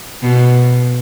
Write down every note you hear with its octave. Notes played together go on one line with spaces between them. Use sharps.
B2